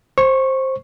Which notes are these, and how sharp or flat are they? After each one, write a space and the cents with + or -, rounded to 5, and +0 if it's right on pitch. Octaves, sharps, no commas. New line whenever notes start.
C5 +15 C#6 -10